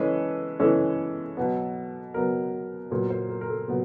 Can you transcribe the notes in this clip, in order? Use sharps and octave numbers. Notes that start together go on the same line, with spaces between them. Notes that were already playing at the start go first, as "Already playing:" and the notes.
Already playing: E3 G#3 C#4 A4 B4
E3 G#3 C#4 A4
B2 F#3 B3
B2 F#3 B3 A#4
A#2 F#3 B3 A#4
A#4 C5
A#4
A#4
A4
A#2 F#3 B3